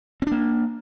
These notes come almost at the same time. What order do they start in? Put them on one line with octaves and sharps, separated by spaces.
C4 D4 A#3